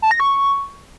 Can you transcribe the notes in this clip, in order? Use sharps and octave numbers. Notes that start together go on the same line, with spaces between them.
A5
A#6
C#6